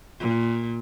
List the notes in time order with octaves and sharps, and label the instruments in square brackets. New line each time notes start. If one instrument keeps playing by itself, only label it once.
[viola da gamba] A#2